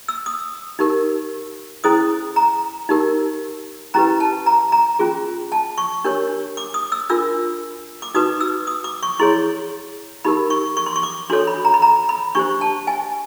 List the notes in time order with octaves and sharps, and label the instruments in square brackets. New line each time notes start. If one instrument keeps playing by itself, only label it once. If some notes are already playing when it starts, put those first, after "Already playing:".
[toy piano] E6
D#6
D#4 G4 A#4
C#4 E4 G#4 C5 D#6
A#5
D#4 G4 A#4
C#4 E4 G4 B4 A#5
A5
A#5
A#5
C#4 F4 G#4
A5
C#6
D4 G4 A#4 C#5
D6
D#6
E6
D4 F4 A#4 E6
D6
D#4 F#4 B4 D#6
E6
D#6
D6
C#6
E4 G#4 C#5 C6
D#4 G4 A#4 B5
C#6
C#6
C6
C#6
D6
D4 F#4 A4 C#5 C6
B5
A#5
B5
A#5
B5
D4 G4 C5 C#6
A5
G#5